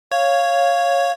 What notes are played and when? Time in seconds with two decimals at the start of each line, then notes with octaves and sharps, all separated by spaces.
0.12 C#5 F5